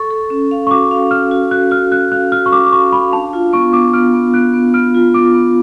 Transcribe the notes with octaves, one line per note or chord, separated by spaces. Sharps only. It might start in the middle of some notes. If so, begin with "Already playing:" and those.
Already playing: A4 C#6
A4
C#4
F5
C#6
F#4 D6
F5
C#4 F6
F#4
F#4 F#6
F#4 F6
F#4 F#6
F5 F#6
F#4 F6
C#6
F#4 D6
D6
F5 C#6
F5 B5
D4 A5
F4
B3 C#6
B3 D6
B3 F6
B3
B3 F#6
B3
B3 F6
F4
B3 D6
B3